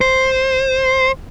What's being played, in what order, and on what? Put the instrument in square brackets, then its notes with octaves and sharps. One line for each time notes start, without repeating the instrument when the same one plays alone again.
[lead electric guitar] C5